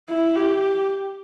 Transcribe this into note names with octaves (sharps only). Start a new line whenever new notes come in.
E4
G4